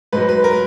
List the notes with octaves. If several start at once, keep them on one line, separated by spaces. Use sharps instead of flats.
G#2 F#3 B4
B4
A#4